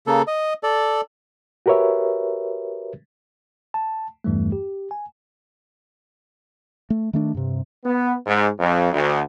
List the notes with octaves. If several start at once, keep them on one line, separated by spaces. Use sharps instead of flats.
C#3 A#3 A4
D#5
A4 D5
F#4 G4 A#4 B4 C#5 E5
A5
E2 G2 E3 G3 A3
G4
G#5
A3
D#3 A3 D4
G2 C3
B3
G#2
F2
D2